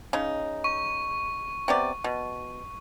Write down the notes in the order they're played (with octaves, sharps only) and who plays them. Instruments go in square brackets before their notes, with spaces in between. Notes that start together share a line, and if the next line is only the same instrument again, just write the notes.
[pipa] C#3 D#4
[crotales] C#6
[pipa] C3 B3 D5
B2